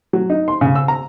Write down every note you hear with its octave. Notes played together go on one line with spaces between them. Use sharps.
F#3
D#4
C6
C#3
E6
A#5